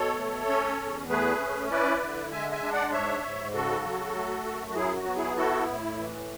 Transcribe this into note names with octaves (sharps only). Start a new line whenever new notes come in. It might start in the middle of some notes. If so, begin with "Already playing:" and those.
Already playing: B2 A4 C#5
A3
C#4
E2
A3 G#4 B4
C#4
E4 B4 D5
D3
G#3 E5 G#5
E5 G#5
D4
D5 F#5
G#2 C#5 E5
G#2
C#3 F#4 A4
F#3
A3
F#2
F#4
F#3 E4 G#4
F#4
B3
E4 G#4
E4 F#4 A4
A2
E3